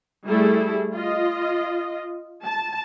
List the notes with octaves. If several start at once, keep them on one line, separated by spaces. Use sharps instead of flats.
G3 A3 E4 G#4 A4
F4 D#5
A5